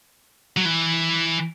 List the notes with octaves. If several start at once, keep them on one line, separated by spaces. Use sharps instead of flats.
F#3
E3